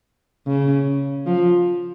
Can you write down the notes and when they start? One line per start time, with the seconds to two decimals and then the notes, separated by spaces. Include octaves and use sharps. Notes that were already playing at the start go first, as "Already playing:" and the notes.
0.47 C#3
1.26 F3